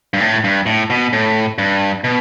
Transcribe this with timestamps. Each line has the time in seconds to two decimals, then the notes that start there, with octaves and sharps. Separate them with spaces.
0.14 G2
0.20 A2
0.44 G2
0.66 A2
0.90 B2
1.13 A2
1.58 G2
2.04 B2